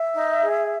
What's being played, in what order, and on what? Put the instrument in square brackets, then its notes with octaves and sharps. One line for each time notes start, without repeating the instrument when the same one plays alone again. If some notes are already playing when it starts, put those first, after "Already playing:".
Already playing: [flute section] E5
D#4
G#4